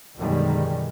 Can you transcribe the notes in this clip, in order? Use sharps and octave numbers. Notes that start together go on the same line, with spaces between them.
F#2 B2 D3 D#3 G3 G#3